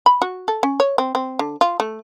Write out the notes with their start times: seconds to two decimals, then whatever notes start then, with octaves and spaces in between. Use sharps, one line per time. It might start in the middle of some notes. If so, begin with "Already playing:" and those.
0.06 B5
0.22 F#4
0.48 A4
0.63 C#4
0.80 C#5
0.98 C4
1.15 C4
1.39 D3
1.61 F4
1.80 A3